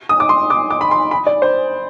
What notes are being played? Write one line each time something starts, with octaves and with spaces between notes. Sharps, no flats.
D#6
D6
C6
D6
D6
B5
C6
B5
D5
C5